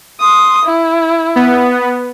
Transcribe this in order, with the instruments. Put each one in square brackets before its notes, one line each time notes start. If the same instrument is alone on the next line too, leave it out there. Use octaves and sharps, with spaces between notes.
[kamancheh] C6 D#6
E4
[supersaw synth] B3